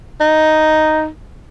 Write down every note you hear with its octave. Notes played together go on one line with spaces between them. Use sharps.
D#4